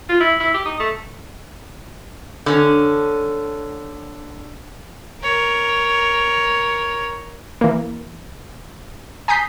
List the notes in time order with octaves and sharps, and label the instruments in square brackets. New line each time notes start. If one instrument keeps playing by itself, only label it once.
[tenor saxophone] F4
E4
E4
G4
D#4
A3
[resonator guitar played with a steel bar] D3 C#4
[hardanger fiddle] A#4 C#5
[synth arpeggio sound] E3 A#3
G#5 A#5 D#6 G6 B6 C7